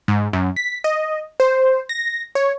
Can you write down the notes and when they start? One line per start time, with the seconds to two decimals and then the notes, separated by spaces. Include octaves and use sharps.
0.08 G#2
0.33 F#2
0.56 B6
0.84 D#5
1.40 C5
1.89 A#6
2.35 C#5